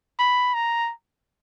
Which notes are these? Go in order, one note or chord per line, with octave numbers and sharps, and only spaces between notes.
B5
A#5